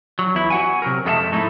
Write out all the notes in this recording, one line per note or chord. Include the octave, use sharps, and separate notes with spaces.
F#3
E2 E4
F#4 F#5 G#5
C3 F#3 A#4
F2 G#3 A3 F#4 E5 A5
G#2 A3 D#4 E4